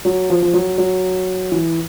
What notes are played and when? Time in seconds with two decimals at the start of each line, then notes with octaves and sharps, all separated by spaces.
0.05 F#3
0.30 F3
0.42 F3
0.53 F#3
0.78 F#3
1.52 E3